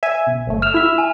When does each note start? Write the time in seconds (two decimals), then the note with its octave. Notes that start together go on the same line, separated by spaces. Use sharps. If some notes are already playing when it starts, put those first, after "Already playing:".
0.03 E5 G#5
0.27 B1
0.47 G1 A3
0.62 F6 E7 F7
0.74 E4 E5
0.98 G#5